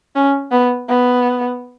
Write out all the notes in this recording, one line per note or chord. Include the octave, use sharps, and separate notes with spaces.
C#4
B3
B3